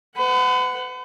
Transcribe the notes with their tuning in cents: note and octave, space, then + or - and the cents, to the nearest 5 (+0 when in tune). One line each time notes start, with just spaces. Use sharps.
B4 +45 F#5 +0